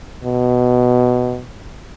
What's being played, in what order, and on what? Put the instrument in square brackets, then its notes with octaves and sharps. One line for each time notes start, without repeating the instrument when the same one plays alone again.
[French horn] B2